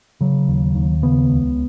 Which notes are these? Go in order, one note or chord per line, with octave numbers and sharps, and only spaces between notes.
C#3 F#3
D#2
D#2
C#3 B3
C#2